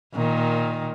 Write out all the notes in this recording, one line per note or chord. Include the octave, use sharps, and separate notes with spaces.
A#2 D#3